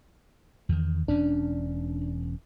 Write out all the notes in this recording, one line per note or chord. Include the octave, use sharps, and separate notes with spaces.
E2 D#3
E1 C#4 D4